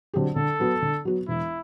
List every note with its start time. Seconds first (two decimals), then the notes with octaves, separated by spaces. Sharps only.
0.14 D3 F#3 C4 G4
0.36 D3 A4
0.60 F#3 B3 F#4
0.82 D3
1.05 F#3 B3 F#4
1.28 E1 E4